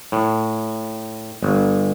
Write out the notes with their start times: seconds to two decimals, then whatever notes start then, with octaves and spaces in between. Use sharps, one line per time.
0.12 A2
1.43 G1